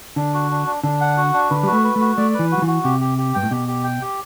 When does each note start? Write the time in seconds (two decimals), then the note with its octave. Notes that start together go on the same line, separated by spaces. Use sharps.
0.16 D3 D4
0.34 F#4
0.51 D4
0.66 D4
0.83 D3 D4
1.01 F#5
1.17 F#4
1.34 D4
1.50 D3 B4
1.63 G3 F#4
1.72 A3
1.84 B4
1.96 A3 F#4
2.17 A3 D5
2.34 B4
2.39 E3
2.51 F#4
2.58 F#3
2.62 E3
2.67 F#4
2.84 C3 G4
3.01 G4
3.18 G4
3.34 G2 G5
3.43 A2
3.51 B2 G4
3.68 G4
3.84 G5
4.02 G4